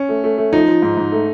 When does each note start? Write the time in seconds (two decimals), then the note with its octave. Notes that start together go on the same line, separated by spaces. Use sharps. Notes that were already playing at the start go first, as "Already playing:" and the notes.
Already playing: C#4
0.09 A3
0.24 A3
0.38 A3
0.53 F3 D#4
0.68 F3
0.82 G#2
0.97 G#2
1.12 A3